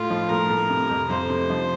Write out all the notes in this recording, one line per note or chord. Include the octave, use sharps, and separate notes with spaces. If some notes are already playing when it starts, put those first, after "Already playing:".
Already playing: A2 F4
F3
A2 A#4
A2
C3
F2
F2 C5
C3
F3